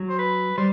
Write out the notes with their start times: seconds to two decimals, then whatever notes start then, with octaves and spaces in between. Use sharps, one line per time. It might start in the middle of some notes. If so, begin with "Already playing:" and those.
Already playing: F#3
0.09 C5
0.19 B4
0.58 G3 C5